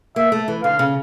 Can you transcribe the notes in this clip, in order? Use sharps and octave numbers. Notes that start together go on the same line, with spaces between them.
A#3 E5
A3
E3
D3 F5
C#3